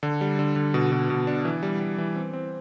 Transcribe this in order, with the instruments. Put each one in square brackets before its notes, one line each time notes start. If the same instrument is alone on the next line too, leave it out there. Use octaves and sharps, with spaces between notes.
[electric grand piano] D3
G3
D3
D3
B2
B2
B2
D4
E3
G3
G3
E3
C4
C4